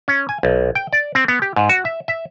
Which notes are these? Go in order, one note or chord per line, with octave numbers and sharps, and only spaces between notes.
C#4
G#5
B1
G5
D5
C4
B3
G4
G#2
F#4
E5
E5